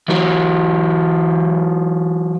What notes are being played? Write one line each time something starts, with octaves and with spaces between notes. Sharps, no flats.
E3 F#3